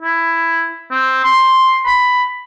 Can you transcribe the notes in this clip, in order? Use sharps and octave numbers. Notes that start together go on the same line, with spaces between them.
E4
C4
C6
B5